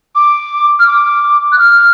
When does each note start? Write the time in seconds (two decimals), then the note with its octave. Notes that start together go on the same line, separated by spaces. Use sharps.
0.15 D6
0.80 F6
0.87 D6
1.52 F#6
1.59 F6